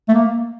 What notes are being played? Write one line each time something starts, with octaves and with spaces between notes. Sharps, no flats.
A3
A#3